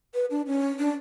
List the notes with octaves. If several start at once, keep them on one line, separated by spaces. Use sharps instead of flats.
B4
D4
C#4
D4